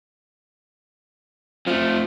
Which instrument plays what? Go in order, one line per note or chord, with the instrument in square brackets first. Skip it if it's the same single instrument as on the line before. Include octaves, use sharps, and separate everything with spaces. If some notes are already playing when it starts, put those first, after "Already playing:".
[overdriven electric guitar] F2 A3 [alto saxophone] F3